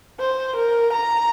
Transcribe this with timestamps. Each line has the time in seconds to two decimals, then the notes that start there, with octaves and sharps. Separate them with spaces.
0.20 C5
0.57 A#4
0.93 A#5